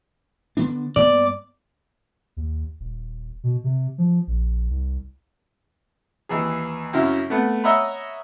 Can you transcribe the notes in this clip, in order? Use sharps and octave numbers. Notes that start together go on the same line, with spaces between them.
D3 B3 D4
G2 A#3 B3 D5
D#2
D#1
B2
C3
F3
A#1
C2
D#2 E3 G#4
F#2 C#3 E4
A3 B3 F#5
C#5 D#5 E5 F#5 A#5 B5